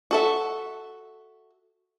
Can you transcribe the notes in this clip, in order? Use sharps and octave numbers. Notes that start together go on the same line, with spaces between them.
F#4 A4 E5